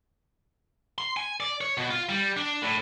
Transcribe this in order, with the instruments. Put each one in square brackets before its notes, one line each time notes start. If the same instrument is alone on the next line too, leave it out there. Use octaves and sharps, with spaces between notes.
[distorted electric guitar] C6
G#5
D5
C#5
B2
F4
G3
D4
A2